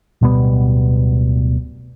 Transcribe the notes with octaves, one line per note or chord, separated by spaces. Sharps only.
D1 B2 G3 B3